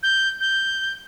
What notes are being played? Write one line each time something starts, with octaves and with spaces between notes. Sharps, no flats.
G6
G6